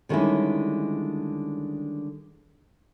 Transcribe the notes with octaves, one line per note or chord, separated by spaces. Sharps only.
D3 D#3 G3 G#3 C#4 E4